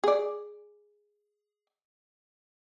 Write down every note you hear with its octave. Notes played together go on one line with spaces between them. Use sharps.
G#4 D5